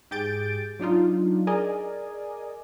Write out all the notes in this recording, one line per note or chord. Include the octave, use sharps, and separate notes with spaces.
G#2 G4 G#4 G6 A6 D7
F#3 D4 D#4 F4
G#4 A#4 D5 D#5 G#5